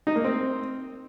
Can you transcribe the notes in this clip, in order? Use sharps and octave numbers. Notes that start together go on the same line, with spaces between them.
D#4
A#3
C4